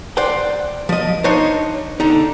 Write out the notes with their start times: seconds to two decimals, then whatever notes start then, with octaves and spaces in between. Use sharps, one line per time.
0.17 C5 D5 F#5 G5
0.89 F3 D#5
1.24 D4 D#4 C5 C#5 D#5
2.00 D3 D#4